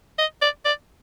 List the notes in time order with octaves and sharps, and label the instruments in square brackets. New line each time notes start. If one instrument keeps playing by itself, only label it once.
[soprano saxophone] D#5
D5
D5